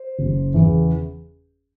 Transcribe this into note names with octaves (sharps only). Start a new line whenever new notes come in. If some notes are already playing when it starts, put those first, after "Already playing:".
Already playing: C5
F#1
E2 C#3 E3